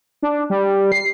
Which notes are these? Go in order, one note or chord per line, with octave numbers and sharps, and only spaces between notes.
D4
G3
C7